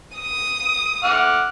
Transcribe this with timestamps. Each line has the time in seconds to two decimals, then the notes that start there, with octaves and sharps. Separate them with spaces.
0.17 D#6
1.04 F#5 D6 F6